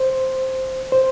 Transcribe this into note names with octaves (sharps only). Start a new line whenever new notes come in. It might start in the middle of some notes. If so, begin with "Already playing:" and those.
Already playing: C5
C5